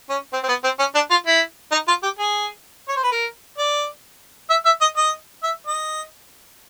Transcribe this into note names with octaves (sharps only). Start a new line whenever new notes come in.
C#4
C4
C4
B3
C4
C#4
D4
F4
E4
D#4
F4
G4
G#4
C#5
C5
B4
A#4
D5
E5
E5
D#5
D#5
E5
D#5